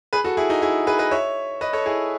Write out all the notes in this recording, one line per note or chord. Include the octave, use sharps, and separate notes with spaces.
G#4 B4
F#4 A4
E4 G#4
D#4 F#4
E4 G#4
G#4 B4
B4 D#5
C#5 E5
B4 D#5
A4 C#5
E4 G#4